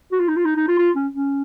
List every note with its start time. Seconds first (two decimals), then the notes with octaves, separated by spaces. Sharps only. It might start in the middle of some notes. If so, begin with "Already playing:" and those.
0.12 F#4
0.20 F4
0.28 D#4
0.37 F4
0.45 D#4
0.56 D#4
0.68 F4
0.78 F4
0.96 C#4
1.12 C#4